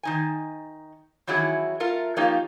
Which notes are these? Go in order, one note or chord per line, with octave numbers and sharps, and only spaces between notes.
D#3 D#4 G#5
D#3 E3 F#3 C#4 E4 G#4
A3 F4 A#4
F3 A#3 C#4 D#4 F4 G4